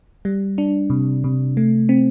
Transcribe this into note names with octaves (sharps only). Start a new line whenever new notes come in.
G3
D4
C3
C3
A3
C4